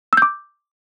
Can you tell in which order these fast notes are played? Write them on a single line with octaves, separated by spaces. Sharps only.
E6 G6 D6